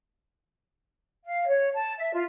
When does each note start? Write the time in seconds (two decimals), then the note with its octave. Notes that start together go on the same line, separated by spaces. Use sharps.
1.25 F5
1.47 C#5
1.75 A5
1.97 E5
2.13 F4